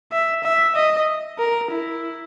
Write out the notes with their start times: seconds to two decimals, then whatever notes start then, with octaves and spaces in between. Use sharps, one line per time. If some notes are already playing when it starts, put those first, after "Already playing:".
0.12 E5
0.44 E5
0.76 D#5
1.39 A#4
1.71 E4